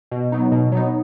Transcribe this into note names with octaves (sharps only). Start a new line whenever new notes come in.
B2
F#3 B3 D#4
B2
F#3 B3 D#4